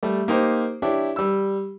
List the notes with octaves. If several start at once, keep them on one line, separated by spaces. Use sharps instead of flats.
G3 A3
A#3 D#4 G4 C5
D4 E4 G4 C#5
G3 E6